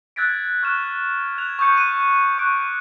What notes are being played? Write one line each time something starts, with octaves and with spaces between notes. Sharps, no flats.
E6 F#6 G#6 A6 B6 D7
C#6 F6 F#6 E7
F#6 G#6 F7
C#6 D#6 G6 C#7
F#6 D#7
C#6 D6 F#6 D7